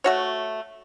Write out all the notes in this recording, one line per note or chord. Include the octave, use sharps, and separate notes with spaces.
A3 F#4 C#5